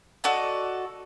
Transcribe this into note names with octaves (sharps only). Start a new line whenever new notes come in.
F#4 A4 D5 D#5